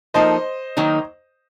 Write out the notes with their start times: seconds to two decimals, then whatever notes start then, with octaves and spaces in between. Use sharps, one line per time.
0.14 F3 A#3 D#4 A4 C5 D#5
0.77 D#3 F#3 A#3 D#4